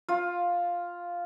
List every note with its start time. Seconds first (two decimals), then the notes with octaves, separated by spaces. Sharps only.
0.09 F4